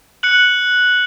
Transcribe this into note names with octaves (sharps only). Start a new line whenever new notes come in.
F#6 C#7 F#7